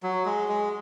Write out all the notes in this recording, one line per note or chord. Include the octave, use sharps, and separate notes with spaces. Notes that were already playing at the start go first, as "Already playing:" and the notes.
F#3
G#3
G#3